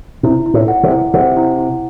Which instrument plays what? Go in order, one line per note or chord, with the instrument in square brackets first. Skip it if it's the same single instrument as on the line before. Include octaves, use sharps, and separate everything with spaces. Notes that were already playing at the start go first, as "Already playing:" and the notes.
[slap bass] C3 [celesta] E4
[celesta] E4
[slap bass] A2
[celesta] F#5
[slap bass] C3
[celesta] E4
[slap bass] C3 [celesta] F#5
[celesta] E4
E4